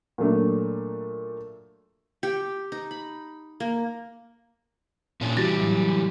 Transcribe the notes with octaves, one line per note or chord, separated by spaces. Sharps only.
A#2 F#3 A3 D4
G4
D#4
B5
A#3
A#2 C#4 D4
E3 G3 F#4 A6 A#6
A2 F#3